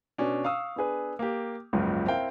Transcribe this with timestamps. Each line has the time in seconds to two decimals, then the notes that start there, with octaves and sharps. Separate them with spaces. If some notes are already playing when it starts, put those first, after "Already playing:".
0.18 B2 C#4 D4
0.44 F5 C#6 D#6 E6
0.76 B3 D4 G#4 B4
1.19 A#3 G4
1.73 F#1 C#2 G#2 C#3 F3
2.06 C4 E4 A#4 F5 G5